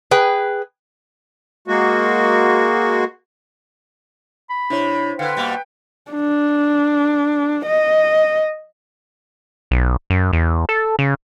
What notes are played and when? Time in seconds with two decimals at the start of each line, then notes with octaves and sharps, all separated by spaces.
0.11 G#4 B4 G5
1.68 G#3 A#3 F#4
4.50 B5
4.70 C3 D4 E4 C#5
5.19 D3 B4 F5 G5 C#7
5.37 B2 G3 A#3
6.11 D4
7.66 D#5
9.71 B1
10.10 F#2
10.33 E2
10.69 A4
10.99 C#3